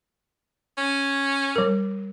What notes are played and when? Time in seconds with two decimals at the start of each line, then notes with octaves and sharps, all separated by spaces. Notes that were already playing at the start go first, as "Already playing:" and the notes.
0.77 C#4
1.56 G3 A#4